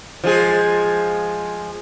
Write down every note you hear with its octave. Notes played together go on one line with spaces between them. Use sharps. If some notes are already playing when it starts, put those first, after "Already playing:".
F3 G#3 G#4